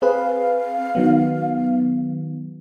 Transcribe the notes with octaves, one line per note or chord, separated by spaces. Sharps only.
C4 G#4 B4 F5
D#3 F#3 B3